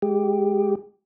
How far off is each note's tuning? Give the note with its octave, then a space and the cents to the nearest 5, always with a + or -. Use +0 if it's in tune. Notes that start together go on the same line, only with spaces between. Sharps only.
G#3 +0 G4 +0